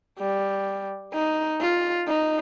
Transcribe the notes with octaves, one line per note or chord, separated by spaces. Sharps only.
G3
D#4
F4
D#4